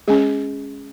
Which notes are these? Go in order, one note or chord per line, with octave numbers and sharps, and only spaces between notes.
G#3 C#4 G#4